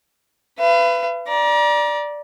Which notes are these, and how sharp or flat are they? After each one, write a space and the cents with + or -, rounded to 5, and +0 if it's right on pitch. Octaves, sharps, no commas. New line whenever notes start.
B4 +20 F5 -45
D5 +0 A#5 +35